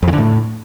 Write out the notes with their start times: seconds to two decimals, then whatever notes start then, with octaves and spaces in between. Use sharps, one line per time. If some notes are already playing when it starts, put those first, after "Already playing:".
0.03 F2
0.08 E3
0.13 D3
0.18 A2